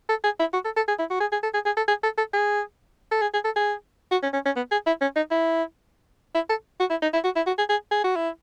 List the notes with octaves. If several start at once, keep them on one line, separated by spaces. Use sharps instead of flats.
A4
G#4
E4
F#4
A4
A4
G#4
E4
F#4
G#4
G#4
A4
G#4
G#4
A4
G#4
A4
A4
G#4
A4
G#4
G#4
A4
G#4
F#4
C#4
C#4
C#4
B3
G#4
E4
C#4
D#4
E4
E4
A4
F#4
E4
D#4
E4
F#4
E4
F#4
G#4
G#4
G#4
F#4
E4